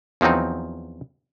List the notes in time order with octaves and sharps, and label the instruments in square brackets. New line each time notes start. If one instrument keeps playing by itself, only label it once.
[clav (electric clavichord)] E2 F3 F#3 C4 D#4